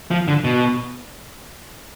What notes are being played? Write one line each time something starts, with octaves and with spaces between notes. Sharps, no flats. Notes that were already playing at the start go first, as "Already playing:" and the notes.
F3
D3
B2